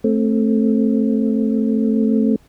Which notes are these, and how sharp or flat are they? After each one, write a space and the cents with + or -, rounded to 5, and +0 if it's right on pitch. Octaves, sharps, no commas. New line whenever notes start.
A3 +0 C4 +25